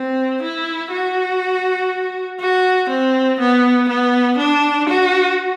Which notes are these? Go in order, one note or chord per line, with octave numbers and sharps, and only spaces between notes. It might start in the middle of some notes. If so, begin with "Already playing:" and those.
Already playing: C4
E4
F#4
F#4
C4
B3
B3
D4
F#4